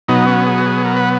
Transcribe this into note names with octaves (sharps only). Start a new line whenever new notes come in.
B2 F#3 B3 D#4
C#4
G#4
F#4
G#4
A#4
B4